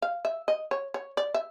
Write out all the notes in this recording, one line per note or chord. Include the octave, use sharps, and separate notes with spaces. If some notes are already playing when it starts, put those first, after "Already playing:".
F5
E5
D#5
C#5
C#5
D5
E5